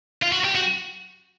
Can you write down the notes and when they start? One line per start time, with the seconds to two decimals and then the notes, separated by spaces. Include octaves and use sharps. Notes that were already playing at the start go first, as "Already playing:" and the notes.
0.23 F4
0.33 F#4
0.45 G4
0.55 F#4